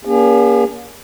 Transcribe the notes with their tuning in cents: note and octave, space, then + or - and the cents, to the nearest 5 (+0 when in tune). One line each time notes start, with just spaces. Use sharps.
A#3 +30 C#4 +40 G#4 -45